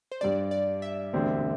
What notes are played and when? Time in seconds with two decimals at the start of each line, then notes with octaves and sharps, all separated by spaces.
0.12 C5
0.21 G2 G3 D4 D5
0.51 D5
0.82 E5
1.13 E1 D2 D3 C4 G4